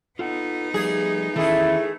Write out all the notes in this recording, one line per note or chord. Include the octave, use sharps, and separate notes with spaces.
B3 D#4 F4 A4 F#5
F3 G3 A3 G#4
D#3 E3 A3 C#4 E4 G#4